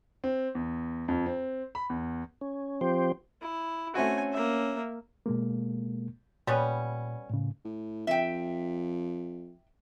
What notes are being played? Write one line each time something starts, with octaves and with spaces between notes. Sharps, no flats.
C4
E2
F2
C4
B5
E2
C#4
F3 C4 G4 C5
E4
A3 C4 C#4 F#4 G#5
A#3 E5
B2 G#3 A#3
A#2 G3 B3 C#4
A2 C#3
A2
F2 E5 G5